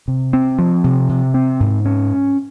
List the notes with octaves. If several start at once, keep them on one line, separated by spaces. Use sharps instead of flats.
C3
C4
F3
C3
C3
C4
G#2
C#4